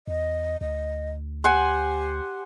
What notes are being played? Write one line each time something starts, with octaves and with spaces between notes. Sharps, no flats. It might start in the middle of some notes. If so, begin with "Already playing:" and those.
E2 D#5
D2 D#5
G4 C5 F#5 G#5